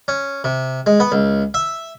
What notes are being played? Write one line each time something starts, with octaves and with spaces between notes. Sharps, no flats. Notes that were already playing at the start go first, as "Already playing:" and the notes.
C#4
C3
G#3
B3
C#2
E5